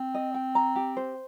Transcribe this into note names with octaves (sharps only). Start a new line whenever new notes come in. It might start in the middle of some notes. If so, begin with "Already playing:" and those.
Already playing: C4
D#5
G5
A#5
G4
C5